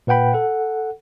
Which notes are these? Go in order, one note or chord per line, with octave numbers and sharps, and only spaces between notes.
A#2 B4 F#5 G5 B5
A4 F#5